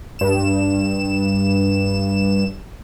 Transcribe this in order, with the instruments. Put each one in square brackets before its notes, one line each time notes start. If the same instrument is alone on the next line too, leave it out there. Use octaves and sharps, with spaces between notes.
[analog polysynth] G2 E7